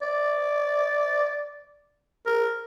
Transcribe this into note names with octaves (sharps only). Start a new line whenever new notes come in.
D5
A#4